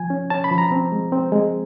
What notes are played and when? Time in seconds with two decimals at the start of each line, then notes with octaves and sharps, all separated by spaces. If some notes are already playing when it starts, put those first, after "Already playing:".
Already playing: F3 G#5
0.10 C#4
0.30 C#4 A5
0.44 B5
0.51 F3
0.58 A#5
0.72 C4
0.92 G#3
1.12 C4
1.32 G#3